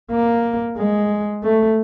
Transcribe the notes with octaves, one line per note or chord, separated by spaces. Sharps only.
A#3
G#3
A3